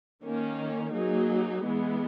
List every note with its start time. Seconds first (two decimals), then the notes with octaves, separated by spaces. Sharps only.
0.22 D#3 A#3 C#4
0.92 F#3 A#3 D#4 G#4
1.63 E3 G#3 B3